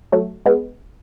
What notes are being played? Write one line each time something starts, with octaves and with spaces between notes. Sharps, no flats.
F#3 A3
G#3 B3